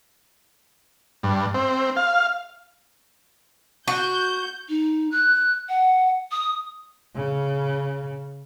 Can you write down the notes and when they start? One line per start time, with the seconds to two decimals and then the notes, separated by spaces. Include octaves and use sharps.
1.23 G2
1.54 C4
1.96 F5
3.88 F#4 G6
4.69 D#4
5.12 F#6
5.69 F#5
6.32 D#6
7.16 C#3